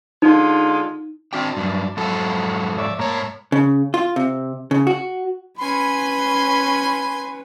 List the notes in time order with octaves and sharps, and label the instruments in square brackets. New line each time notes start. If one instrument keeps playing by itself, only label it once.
[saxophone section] D3 G#3 F4 [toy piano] D#4
[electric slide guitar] C4 F#4 G5 [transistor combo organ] D4
[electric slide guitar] G2 F#3
[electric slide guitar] F2 G#2 A4 [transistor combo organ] F#3
[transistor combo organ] C#5 D5 E5
[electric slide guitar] G#2 C#5 [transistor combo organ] A#3 A5 A#5
[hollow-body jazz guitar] C#3
F4
C3
C#3
F#4
[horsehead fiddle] C#4 B4 [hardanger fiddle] G#5 C6 [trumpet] B5